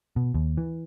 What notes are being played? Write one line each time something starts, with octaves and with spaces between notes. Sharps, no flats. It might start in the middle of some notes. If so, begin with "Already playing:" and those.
B2
D#2
E3